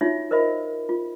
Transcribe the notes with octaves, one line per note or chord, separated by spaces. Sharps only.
D#4 F4 F#4 C#5 E5
A#4 C5 D#5 E5 B5
F4